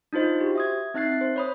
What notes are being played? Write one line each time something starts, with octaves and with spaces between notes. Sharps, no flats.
D4 D#4 F4 C5 D#5
F#4 G4 C5
E5 D#6 G#6
C4 D#4 E5 F#6 A6 C7
C5
C#5 B5 D#6